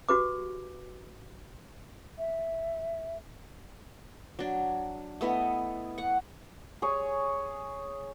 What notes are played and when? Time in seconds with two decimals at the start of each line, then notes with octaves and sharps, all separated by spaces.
0.09 F#4 G4 B4 D6
2.17 E5
4.39 F#3 D4
5.21 A3 B3 E4 D#5
5.98 F#5 C#6
6.82 G#4 C#5